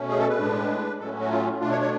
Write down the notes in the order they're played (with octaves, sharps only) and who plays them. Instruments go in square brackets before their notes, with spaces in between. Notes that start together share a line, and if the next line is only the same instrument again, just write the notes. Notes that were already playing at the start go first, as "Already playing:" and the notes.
Already playing: [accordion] B2 A3 C#4
G#4
A4
B4
A2 G#3 D4
A2 F#3 A3 C#4 A4
F#4
F4
B2 A3 D4 F4
C#5
C#5